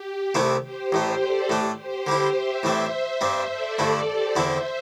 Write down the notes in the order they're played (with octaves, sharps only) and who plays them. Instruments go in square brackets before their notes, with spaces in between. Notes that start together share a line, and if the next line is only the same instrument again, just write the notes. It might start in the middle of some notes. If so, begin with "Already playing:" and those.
Already playing: [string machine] G4
[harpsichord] C2 C3 A3 C4 E4
[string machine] G4 C5
[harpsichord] A1 A2 A3
[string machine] A4 D5
[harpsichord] A2 A3 D4
[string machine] G4 C5
[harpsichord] D3 G3 E4
[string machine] C5 E5
[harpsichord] A2 E3 G3 C4
[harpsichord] G2 G3 C4 [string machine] C5 E5
[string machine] A4 D5
[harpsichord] G2 D3 A3 E4
[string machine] G4 C5
[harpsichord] E2 D3 C4 E4 [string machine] C5 E5